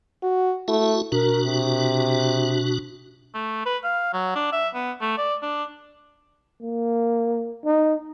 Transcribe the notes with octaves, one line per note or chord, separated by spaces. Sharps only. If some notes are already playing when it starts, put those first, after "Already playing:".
F#4
A3 E4 F#4
B2 D4 F#4 A#4
C3
A3
B4
F5
F#3
D4
E5
B3
A3
D5
D4
A#3
D#4